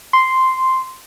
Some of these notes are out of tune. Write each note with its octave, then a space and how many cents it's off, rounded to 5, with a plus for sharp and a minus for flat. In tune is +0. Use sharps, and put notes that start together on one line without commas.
C6 -5